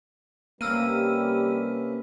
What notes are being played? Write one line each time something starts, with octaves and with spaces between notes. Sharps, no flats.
C3 G3 A#3 C#4 B4 E6 F6 D#7